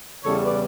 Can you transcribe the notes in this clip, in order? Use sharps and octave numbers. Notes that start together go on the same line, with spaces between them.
E2 C#3 G3 A4 C#5
B4 D5